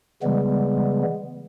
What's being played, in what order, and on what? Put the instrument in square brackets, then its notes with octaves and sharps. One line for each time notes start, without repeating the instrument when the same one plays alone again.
[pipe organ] C#3 E3 G3 G#3 B3